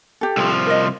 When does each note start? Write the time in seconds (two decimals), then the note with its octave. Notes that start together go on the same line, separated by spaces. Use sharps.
0.21 G4 A4
0.37 C2 F3
0.66 A#4 D#5